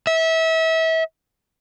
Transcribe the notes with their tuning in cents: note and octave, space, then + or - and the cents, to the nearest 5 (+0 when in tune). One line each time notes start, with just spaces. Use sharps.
E5 -30